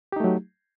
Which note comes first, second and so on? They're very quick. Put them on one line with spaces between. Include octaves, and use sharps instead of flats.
G4 D#4 A3 F#3